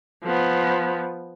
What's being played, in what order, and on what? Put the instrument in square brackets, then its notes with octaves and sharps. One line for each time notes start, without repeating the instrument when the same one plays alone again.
[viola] F3 B3